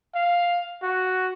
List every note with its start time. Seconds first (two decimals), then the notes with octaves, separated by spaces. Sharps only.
0.15 F5
0.82 F#4